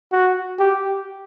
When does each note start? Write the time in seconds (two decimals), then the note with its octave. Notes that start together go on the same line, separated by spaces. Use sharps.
0.12 F#4
0.59 G4